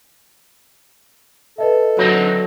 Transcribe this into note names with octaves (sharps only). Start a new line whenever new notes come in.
A4 B4 D#5 E5
D3 F#3 C4 D#4